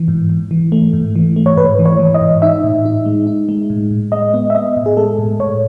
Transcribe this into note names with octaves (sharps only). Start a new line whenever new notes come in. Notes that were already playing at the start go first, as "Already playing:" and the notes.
Already playing: E3
G#2
G#2
E3
A3
G#2
E3
A3
C#5
G#2 B4
E3
C#5
E3
D#5
G#2
D#4 E5
A2
D#4
G#3
D#4
G#3
A2
A2
G#3 D#5
B3
E5
B3 D#5
A2
G#4
G#3 A4
A2
A2 C#5